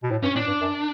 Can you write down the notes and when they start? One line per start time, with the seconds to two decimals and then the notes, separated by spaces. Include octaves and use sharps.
0.03 B2
0.11 A2
0.23 G2 C#4
0.35 A2 D4
0.47 G2
0.61 F#2